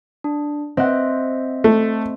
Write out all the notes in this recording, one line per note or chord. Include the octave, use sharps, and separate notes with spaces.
D4
C4 C5 D#5 E5 F#5
A3